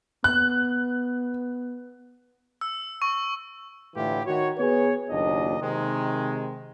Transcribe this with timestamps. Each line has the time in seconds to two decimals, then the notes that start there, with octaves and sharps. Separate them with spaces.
0.24 B3 F#6
2.61 E6
3.02 C#6
3.95 A2 D3 E3 E4 F4 G4
4.26 D#3 F#4 C#5
4.58 B3 G#4 B4 C#5
5.09 F#1 D#2 A#2 D4 D#5
5.61 C3 D#3 G#3